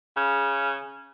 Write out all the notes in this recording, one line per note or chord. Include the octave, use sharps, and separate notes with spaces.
C#3